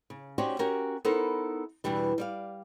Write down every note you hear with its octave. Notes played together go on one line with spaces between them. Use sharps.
C#3
C#4 D#4 F#4 G4 C5 D5
C#4 F#4 G4 A#4
B3 D#4 E4 A4 A#4 C5
E2 B2 E3 G3 D4
G3 D5 F5